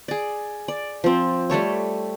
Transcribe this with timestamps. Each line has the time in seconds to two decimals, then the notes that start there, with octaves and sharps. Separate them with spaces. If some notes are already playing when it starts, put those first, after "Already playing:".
0.08 G#4 D5
0.68 D5
1.04 F3 C4
1.50 G3 A3 A4 C#5